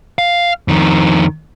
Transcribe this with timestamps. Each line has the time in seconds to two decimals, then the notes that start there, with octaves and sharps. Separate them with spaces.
0.19 F5
0.68 F2 D#3